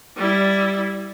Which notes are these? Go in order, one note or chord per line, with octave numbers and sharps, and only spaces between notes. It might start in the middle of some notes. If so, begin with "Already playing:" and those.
G3 E4